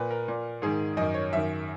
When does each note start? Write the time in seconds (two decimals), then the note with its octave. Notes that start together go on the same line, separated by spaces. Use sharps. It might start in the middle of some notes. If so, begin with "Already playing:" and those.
Already playing: A#2 B4
0.11 A#4
0.28 A#2
0.62 G#2 D#3 G#4
0.97 F#2 D#3 D#5
1.14 C#5
1.32 F#2 D#3 E5